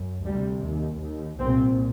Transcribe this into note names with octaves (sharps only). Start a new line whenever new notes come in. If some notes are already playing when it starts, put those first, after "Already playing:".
Already playing: F#2
D2 C3 G3
D#2
D#2
C2 A#2 C4